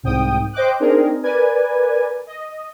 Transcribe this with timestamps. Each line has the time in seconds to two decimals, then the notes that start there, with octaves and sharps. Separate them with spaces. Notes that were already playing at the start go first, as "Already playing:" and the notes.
0.03 C2 G#2 G5 D#6
0.53 C5 D#5 G5 D6 F#6
0.80 C4 D4 D#4 G#4 A#4
1.23 A#4 B4 D5 G#5
2.27 D#5